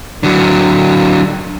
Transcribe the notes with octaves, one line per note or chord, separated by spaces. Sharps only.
D3 F#3